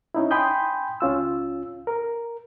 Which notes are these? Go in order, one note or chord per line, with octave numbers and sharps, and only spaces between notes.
C#4 D#4 E4
G5 G#5 B5 C6 D#6 G6
C#2 C#4 F4 E6
A#4